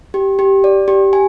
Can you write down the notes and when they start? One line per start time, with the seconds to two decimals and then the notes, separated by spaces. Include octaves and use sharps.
0.14 G4
0.39 G4
0.64 D5
0.88 G4
1.13 G#5